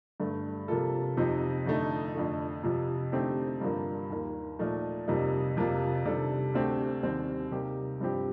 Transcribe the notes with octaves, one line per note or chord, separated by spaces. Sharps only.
G2 D3 A3
C3 F3 A#3 F4 A4
F2 C3 F3 C4 D#4
F2 D3 A3 D#4
F2 D3 A3
F2 C3 F3
D3 A3 C4 D#4 G4
G2 D3 F3 A#3 D4
D#2 D#3 A#3
A#2 F3 A3 D#4
F2 C3 G3 A#3 D#4
F2 C3 F3 A#3 F4
C3 D#3 G3 D4 A4
D2 D3 A3 C4 G4
D#2 D#3 G3 C4
C3 G3 A#3 D#4 G4
G2 F3 C4 G4